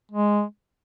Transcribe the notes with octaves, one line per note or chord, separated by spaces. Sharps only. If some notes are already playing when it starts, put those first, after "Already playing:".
G#3